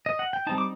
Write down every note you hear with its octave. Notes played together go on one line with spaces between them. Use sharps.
D#5
F#5
G5
G3 C4 D#4 A5
D6